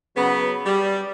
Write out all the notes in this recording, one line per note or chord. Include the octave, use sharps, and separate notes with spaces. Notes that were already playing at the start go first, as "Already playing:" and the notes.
C#3 F#3 B3
G3